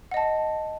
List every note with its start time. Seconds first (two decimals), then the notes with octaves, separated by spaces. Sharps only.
0.11 F#5
0.14 D#5
0.17 A5